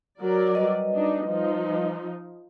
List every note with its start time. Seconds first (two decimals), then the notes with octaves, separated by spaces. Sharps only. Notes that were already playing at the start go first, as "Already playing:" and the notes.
0.21 F#3 A#4 D5
0.55 G3 B4 D#5
0.95 D4 D#4
1.28 F3 D#4